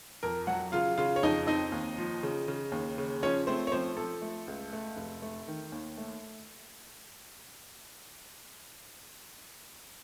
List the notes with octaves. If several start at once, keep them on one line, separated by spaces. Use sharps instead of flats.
F2 A#4
F#3 F#4 F#5
C#3 F4 F5
C#3 F4 F5
C#5
F2 D#4 D#5
C4 D#4 D#5
D#2
F3
C#3
C#3
D#2
C#3
F3 C#4 C#5
A3 C4 C5
C#5
F3 C4 C5
F3 A4
A3
C#2
A3
F1
A3
D#3
D#2
A3